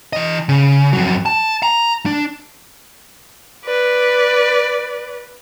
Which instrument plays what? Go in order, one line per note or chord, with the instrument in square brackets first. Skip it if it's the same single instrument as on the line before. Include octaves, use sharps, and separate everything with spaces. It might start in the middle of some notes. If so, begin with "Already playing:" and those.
[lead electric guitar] E3 D#5
C#3
F2 F#3
A5
A#5
D4
[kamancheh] B4 D5